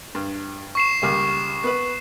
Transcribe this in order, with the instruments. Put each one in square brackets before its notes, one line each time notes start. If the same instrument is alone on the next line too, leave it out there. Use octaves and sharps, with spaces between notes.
[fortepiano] G2
[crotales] C#6 C7 E7
[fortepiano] C#2 G3 A#3
B3 B4